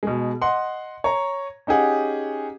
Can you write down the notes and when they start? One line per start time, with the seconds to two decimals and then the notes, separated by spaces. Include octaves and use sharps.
0.03 B2 G#3
0.42 D#5 F#5 C6
1.04 C#5 A#5
1.67 C#4 D#4 G4 G#4 F#5